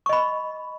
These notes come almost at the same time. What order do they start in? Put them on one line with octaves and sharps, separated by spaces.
C#6 D#5 B5